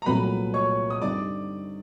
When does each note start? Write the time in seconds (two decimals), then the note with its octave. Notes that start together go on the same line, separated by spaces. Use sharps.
0.02 A#5
0.06 C2 A#2 F#3 A3 B4 B5
0.54 C#5 C#6
0.90 D#6
1.01 G2 D3 G3 C4 D#4 D5 D6